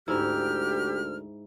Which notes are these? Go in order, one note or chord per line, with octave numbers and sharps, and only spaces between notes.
D2 G#2 E4 G4 F6